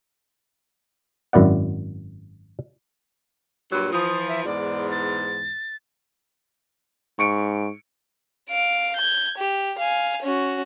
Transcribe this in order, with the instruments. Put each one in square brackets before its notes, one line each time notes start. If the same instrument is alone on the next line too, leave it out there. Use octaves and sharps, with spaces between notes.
[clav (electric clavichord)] G#1 F#2 E4 D5 F#5
[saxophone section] G2 A#2 F#3
[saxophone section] E3 F3 [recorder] D#6
[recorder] E5
[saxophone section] E2 G#2 [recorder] D5
[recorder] A6
[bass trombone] G#2 [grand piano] C#6 C#7 D7
[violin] F5 D7
G6 G#6
G4
F5 G#5
C#4 F#4